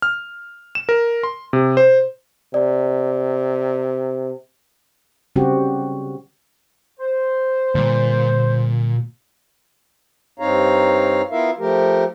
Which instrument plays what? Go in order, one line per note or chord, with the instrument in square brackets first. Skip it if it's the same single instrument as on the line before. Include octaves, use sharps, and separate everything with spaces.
[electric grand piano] F6
E7
A#4
C6
C3
C5
[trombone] C3 [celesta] D5
[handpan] C#3 G3 C4 F#4 G4
[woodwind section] C5
[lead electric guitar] A#2 [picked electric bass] D3 G3
[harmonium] G2 C4 D#4 C#5 F5 A#5
B3 E4 F4 A#4 E5 F5
F3 A3 G4 A#4